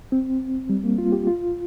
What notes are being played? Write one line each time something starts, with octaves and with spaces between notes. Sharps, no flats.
C4
G3
A#3
F4
G4
F4